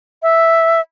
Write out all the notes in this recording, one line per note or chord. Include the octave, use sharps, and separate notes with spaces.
E5